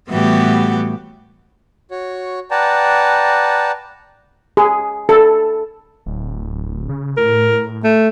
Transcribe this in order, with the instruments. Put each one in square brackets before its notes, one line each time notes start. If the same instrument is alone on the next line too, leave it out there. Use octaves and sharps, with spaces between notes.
[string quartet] A2 E3 G3 B3 F#4 G4
[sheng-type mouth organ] F#4 C#5
B4 D5 F#5 G5 A5 A#5
[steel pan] G#4
A4
[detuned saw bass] D1
C#3
[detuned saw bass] A2 [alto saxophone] A#4
[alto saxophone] A3